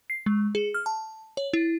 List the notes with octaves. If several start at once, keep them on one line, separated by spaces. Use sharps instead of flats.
C7
G#3
G#4
F6
A5
C#5
E4